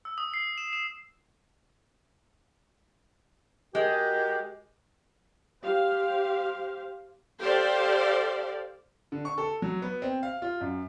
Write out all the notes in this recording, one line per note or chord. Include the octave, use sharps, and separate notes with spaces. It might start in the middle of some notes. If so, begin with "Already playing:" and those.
E6
D#6
C7
E7
E7
G#3 F#4 G4 A#4 D#5
G4 C5 F5
G4 A4 C5 D5 F5
D3
C#6
A4
F#3
B3
C4
F5
F4
F#2